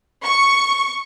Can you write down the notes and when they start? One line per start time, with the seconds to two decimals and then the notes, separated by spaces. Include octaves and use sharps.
0.25 C#6